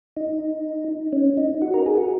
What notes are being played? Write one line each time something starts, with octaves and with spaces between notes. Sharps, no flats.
D#4
C#4
D#4
F#4
A#4
G#4
F#4